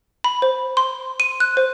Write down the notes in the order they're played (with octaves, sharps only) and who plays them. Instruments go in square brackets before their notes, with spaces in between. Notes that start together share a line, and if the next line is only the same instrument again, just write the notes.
[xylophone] B5
C5
C6
D#7
F#6
C5